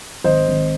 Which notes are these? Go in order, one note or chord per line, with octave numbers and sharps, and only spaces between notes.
G#1 C5 D#5
G#1